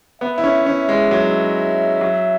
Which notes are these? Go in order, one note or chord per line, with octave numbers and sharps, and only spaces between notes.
B3 E5
E4
C#4
C#4
G#3
F#3
F#3